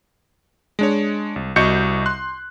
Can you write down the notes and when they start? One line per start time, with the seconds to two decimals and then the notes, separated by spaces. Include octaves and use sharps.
0.79 G#3 D4 C#5
1.36 C2
1.56 C2 F#4 D#5 C#6 G6 C#7
2.06 C6 F#6